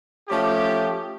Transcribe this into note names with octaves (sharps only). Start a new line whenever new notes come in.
F3 A3 C#4 G4